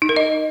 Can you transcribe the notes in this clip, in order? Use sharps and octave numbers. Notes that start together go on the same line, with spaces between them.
D#4
A#4
D#5